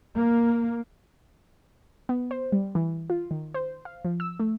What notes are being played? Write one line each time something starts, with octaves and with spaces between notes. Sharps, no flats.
A#3
B3
C5
G3
E3
F4
D#3
C5
F5
F3
E6
A3